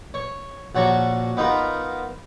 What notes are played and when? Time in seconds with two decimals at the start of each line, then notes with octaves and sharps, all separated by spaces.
0.14 C#5
0.75 A#1 F#4 C#5 A5 A#5 C#6
1.37 B3 D#4 F4 A#4